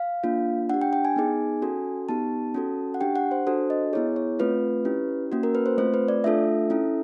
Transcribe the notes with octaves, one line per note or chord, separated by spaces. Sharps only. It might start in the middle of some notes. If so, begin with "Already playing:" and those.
Already playing: F5
A#3 D4 F4
D4 G4 F#5
G5
G5
G#5
B3 D#4 G#4
C#4 F#4 A4
B3 D#4 G4 A5
C#4 F#4 A4
F#5
D4 G4 G5
F#5
C5
D4 F#4 A4 C5
D#5
B3 E4 G#4 C#5
C#5
A3 C4 F4 B4
C#4 E4 G4
A#3 C#4 F#4
A#4
B4
C5
A3 C4 F4 C5
B4
D5
A3 D4 F4 A4 E5
C#4 E4 A4